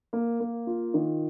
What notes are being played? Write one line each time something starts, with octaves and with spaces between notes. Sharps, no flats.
A#3
A#3
F4
D#3